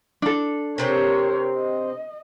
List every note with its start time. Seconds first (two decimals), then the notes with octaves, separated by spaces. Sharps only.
0.22 D4 A4
0.78 C3 C4 A#4 C5 C#5
1.57 D#5